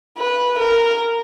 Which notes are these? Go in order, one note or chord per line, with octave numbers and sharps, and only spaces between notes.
B4
A#4